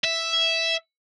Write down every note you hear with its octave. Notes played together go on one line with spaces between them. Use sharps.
E5